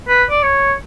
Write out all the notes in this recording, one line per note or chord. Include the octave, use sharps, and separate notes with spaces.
B4
D5
C#5